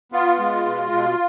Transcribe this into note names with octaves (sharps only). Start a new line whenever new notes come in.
B3 F4
G#3
B2
B2